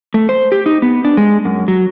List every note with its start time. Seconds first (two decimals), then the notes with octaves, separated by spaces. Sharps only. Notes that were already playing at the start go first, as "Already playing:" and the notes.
0.14 A3
0.29 C5
0.52 G4
0.66 D#4
0.82 B3
1.05 D4
1.17 G#3
1.45 F#2
1.68 F#3